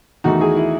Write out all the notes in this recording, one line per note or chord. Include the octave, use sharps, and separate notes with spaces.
E2 D#3 A3 D#4 F#4
E4 G#4
E4